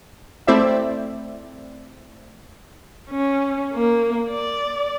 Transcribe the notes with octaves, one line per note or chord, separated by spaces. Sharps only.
A3 C4 E4 C5 D5 E5
C#4
A#3
D5